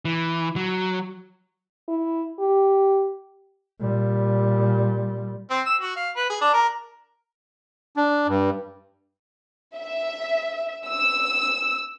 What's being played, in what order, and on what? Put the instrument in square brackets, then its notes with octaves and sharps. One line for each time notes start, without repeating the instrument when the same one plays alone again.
[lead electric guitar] E3
F#3
[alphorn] E4
G4
[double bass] A#2 G3
[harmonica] C4
E6
F#4
F5
B4
G#4
D4
A#4
[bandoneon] D4
G2
[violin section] E5
E6